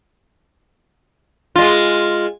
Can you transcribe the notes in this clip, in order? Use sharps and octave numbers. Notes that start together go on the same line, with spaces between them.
G#3 F4